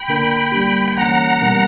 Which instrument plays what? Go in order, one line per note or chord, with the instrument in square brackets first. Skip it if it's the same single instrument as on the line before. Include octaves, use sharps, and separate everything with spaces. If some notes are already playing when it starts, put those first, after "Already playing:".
Already playing: [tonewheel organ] G5 B5
[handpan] D3 A#3 D4 A#4
G3 A#3 D4 G4
[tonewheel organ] G5
[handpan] E3 A#3 C#4 [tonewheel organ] F#5 A#5
[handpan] B2 G3 B3 D4 A#4